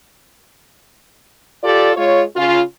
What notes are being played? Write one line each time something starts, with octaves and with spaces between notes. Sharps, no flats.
F4 G4 A4 D5
G#3 F4 C#5
C#3 F4